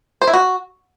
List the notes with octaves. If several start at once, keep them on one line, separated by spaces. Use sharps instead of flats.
C5
E4
F#4